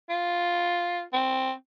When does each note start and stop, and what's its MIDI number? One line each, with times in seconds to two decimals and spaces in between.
0.09 1.02 65
1.13 1.53 60